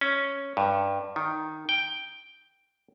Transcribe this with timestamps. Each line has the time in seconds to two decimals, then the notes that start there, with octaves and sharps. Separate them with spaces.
0.01 C#4
0.57 G2
1.16 D#3
1.69 G5